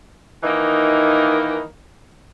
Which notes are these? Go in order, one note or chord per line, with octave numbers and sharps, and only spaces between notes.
D#3 E3 A#3 D#4